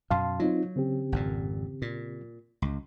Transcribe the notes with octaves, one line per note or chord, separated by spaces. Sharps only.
F#2 B2 F5 A5 C6
F#3 C4 D#4 F4
C#3 C4 G4
G#1 F2 A#2
A#2
C#2